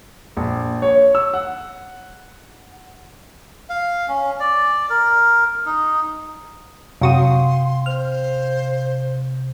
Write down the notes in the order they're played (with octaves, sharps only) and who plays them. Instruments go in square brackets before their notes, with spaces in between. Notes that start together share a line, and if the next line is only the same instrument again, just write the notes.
[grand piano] A#1
C#5
E6
F#5
[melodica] F5
C#4
D5
A#4
D#4
[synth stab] F#2 F#4 D#6 [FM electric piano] C3 [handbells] F5 G5 [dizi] C6
[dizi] C5 [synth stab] F6